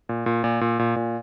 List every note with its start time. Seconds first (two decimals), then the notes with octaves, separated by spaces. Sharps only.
0.09 A#2
0.26 A#2
0.44 A#2
0.61 A#2
0.79 A#2
0.96 A#2